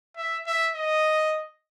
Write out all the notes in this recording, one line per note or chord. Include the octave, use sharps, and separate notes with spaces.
E5
E5
D#5